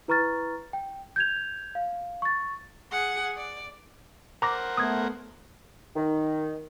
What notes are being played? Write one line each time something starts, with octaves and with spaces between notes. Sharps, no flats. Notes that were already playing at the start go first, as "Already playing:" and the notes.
E4 B4 A#5 C#6 F6 A6
G5
G6 G#6 F7
F5
C#6 A6
G#4 F#5
D5
A#4 C5 F#5 A#5 D6 A#6
A3 B3 D#6 G#6
D#3